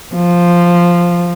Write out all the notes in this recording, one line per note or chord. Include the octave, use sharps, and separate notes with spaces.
F3